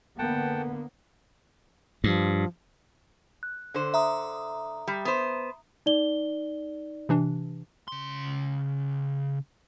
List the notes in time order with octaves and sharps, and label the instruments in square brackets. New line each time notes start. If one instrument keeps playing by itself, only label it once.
[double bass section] D3 A#3 B3 [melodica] F#5 G5 A5
[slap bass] G2 [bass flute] F3
[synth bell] F#6
[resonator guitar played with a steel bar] D3 C5
[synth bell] E5 A#5 D#6
[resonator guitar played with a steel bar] G3
B3 C5
[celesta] D#4 D5 G7
[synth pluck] C3 E3 D4
[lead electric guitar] C#3 C6